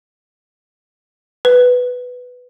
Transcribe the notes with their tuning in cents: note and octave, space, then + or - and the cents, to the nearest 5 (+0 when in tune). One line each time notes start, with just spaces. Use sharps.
B4 +5